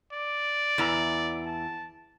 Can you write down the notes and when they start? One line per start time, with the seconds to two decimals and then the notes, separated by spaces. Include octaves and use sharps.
0.13 D5
0.78 E2 E3 A#5
1.46 A5